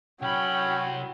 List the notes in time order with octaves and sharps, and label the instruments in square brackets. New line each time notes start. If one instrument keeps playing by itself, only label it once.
[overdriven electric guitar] C2 B5 [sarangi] F#3 [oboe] C#4 [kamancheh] G5